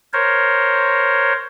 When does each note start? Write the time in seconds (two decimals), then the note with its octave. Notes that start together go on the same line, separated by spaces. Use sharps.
0.13 A#4 C5 C#5